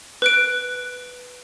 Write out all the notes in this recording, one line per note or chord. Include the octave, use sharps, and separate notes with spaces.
B4 F#6 D7